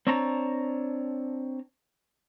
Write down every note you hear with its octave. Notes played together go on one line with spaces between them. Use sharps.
C4 D4 C#5 A5 A#5